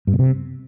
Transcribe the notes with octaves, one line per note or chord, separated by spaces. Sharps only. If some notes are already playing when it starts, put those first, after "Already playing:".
G2
B2
C3